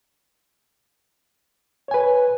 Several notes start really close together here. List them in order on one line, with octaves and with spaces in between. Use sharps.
C#5 G#5 B4